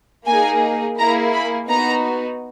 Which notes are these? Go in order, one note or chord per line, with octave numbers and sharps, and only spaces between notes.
A#3 D#4 G#4 G#5
A#3 E4 G#4 A#5
B5
B3 D#4 F#4 A#5